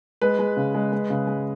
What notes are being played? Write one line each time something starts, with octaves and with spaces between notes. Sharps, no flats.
G#3 B4
G#3
C#3
G#3
G#3
C#3
G#3